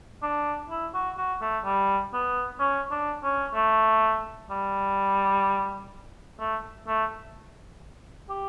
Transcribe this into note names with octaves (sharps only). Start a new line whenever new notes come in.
D4
E4
F#4
F#4
A3
G3
B3
C#4
D4
C#4
A3
G3
A3
A3
G4